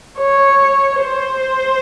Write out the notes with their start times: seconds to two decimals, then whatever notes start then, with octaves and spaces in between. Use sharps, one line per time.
0.19 C#5
1.01 C5